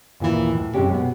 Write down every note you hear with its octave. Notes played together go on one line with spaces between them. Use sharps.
D#2 A#2 D#3 E3
A2
F#2 C3 G#3 C#4 G4
B2 B3